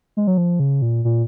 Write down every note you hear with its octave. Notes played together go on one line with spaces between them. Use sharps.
G#3
F#3
F3
C#3
A#2
A#2